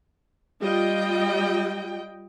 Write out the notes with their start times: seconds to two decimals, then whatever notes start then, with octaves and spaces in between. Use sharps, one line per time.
0.61 G3 F4 D#5 G5